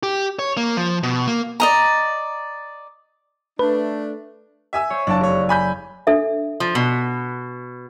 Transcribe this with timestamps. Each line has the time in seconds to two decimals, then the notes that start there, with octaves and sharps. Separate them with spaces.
0.03 G4
0.39 C#5
0.57 A#3
0.77 F3
1.03 B2
1.27 A#3
1.60 D5 D#5 A#5
3.59 A3 D4 B4
4.73 E5 G#5 E6
4.90 C5 C#5
5.07 F#1 D4 D5 A5
5.21 F1 C#5
5.49 G#5 B5 G6
6.07 D4 A4 E5
6.60 F3
6.75 B2